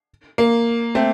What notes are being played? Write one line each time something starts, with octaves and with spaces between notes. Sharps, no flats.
A#3
A3 C4